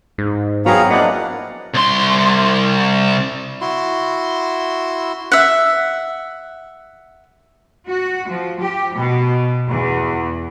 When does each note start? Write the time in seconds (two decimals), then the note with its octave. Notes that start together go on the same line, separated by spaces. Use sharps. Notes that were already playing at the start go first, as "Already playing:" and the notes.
0.18 G#2
0.66 F#3 B3 C4 G#4 F5 A#5
0.91 F3 A#3 D4 E4 D5 D#5 F#5
1.74 C2 C6
3.61 E4 F#4 C6
5.32 E5 F#5
7.88 F#4
8.29 F3
8.60 G4
8.95 B2
9.68 E2